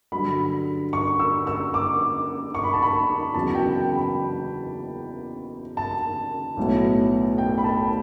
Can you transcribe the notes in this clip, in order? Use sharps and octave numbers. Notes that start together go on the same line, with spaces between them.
G2 D3 F#3 B5
C#6
E6
E6
D6
C#6
B5
A5
B5
F#1 E2 C#3 F#3 A5
G5
G5
B5
A5
B1 A2 F#3 B3
G5
B5
A5